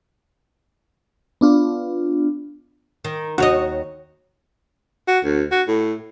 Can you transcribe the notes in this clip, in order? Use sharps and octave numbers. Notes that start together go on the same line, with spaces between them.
B3 D4 F4
D#3
D#2 F#4 C#5 D#5
F#4
D2
F#4
A2